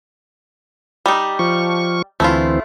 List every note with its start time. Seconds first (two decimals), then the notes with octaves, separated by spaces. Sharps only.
1.06 G3 D#4
1.39 F3 C#6
2.20 D2 E3 A3 C4 E4 F4